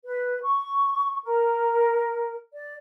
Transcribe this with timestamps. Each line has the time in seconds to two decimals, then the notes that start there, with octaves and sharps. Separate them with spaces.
0.05 B4
0.43 C#6
1.25 A#4
2.53 D5